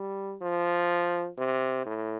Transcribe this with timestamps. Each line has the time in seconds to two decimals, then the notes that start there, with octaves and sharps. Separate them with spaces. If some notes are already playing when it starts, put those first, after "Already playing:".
Already playing: G3
0.41 F3
1.38 C3
1.86 A2